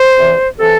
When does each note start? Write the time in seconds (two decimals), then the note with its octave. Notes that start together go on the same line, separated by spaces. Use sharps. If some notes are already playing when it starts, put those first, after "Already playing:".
Already playing: C5
0.18 E2 C3 E3
0.59 C3 E3 A4